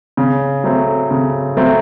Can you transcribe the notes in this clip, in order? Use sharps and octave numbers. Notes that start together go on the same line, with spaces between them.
C#3
F#3 A3 C4
C#3
F#3 A3 C4